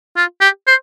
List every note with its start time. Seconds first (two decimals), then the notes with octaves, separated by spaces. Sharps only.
0.17 F4
0.41 G4
0.67 C5